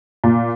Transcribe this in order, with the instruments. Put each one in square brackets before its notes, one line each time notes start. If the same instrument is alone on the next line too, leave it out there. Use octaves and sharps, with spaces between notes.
[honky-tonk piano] A#2